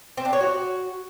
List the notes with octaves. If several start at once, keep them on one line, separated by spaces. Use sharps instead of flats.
C4
D4
C#5
F#4